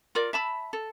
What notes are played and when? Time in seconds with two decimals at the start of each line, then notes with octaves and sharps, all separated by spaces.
0.15 F4 A#4 D5
0.33 E5 A5 B5
0.73 A4